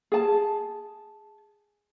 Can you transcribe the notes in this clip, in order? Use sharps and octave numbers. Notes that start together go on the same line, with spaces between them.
G#4 A5